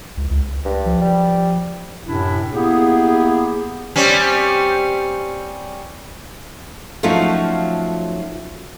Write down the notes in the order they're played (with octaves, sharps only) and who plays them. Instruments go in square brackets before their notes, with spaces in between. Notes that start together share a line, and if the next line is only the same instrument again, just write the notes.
[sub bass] C#2
C#2
[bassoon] G2
[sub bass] F3
[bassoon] G3
[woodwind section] F#2 A2 C3 D4 E4
A#3 B3 E4 G4 G#4
[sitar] G3 C4 C#4
[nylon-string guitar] F3 F#3 A3 C#4 D#4 F4